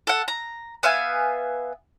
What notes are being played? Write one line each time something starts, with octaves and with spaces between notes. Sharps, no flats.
A4 F#5
A#5
B3 E5 F5 G#5